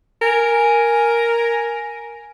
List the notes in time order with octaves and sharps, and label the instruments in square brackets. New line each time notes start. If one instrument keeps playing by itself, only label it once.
[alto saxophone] A#4 [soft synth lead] G#5